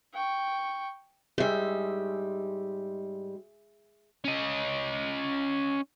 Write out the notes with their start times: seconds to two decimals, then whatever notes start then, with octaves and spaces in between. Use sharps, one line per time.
0.14 G5 C#6
1.38 G#2 G3 G#4 E5
4.24 C#4 D#5